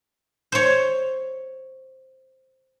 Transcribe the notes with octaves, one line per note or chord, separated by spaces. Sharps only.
C5 C#5